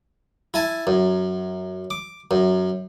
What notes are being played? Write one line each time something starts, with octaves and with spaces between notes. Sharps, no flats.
E4 G#5 A5
F#2
D6
F#2